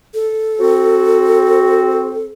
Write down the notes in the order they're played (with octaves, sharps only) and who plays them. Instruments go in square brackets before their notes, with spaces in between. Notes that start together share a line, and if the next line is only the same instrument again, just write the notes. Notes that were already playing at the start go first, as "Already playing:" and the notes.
[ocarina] A4
[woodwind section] C4 F#4